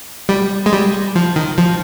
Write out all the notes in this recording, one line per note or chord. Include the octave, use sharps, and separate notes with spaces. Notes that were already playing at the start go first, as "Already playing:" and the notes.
G3
G#3
G3
F3
D#3
F3